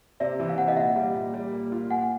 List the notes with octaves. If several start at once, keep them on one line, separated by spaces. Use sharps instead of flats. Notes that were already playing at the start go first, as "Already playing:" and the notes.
C3 D5 E5
E3
F5
C3 F#5
D#5 F5
A#2 E5 F#5
G3
A#2
G3
A#3
F4
A#2 F#5 G#5